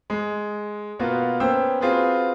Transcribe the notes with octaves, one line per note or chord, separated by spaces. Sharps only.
G#3
B2 A#3 B3 F4 F#4
A#3 B3 C#4 C5 G5 E6
C4 F4 F#4 G#4 B4